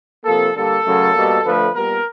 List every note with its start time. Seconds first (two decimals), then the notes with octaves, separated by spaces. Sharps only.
0.24 C3 F3 A#3 A4
0.55 D3 G3 A#3 A4
0.85 F#2 C#3 F#3 A3
1.14 B2 G3 A#3
1.44 D3 F3 A3 B4
1.75 A#2 G3 B3 A#4